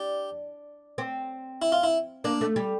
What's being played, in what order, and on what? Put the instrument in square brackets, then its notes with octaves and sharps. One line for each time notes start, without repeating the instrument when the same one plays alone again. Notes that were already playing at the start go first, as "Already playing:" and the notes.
Already playing: [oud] D4 [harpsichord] G4
[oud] C4
[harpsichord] E4
F4
E4
[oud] A#3 [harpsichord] D4
[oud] A3
G3